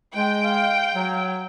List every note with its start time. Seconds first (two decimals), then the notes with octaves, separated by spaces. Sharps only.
0.15 G#3 G5
0.44 F5
0.94 F#3